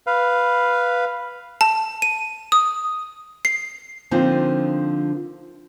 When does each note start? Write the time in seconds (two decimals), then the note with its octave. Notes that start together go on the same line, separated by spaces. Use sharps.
0.07 B4 F5
1.61 A5
2.02 D#7
2.52 D#6
3.45 C7
4.11 D3 F3 A#3 C4 D#4 F4